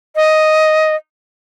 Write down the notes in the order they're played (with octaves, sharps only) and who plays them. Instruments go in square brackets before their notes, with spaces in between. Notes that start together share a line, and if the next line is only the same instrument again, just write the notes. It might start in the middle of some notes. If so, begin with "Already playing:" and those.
[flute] D#5